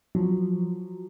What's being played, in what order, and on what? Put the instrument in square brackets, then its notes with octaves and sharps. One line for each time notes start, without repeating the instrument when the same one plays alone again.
[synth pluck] F3 F#3